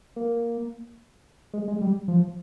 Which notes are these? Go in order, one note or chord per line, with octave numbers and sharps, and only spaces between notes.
A#3
G#3
G#3
G3
F3